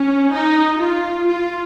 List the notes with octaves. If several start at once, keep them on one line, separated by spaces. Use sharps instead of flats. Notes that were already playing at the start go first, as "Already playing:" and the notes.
Already playing: C#4
D#4
F4
F4